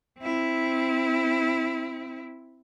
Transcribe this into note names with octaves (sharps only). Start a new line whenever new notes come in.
C4 E4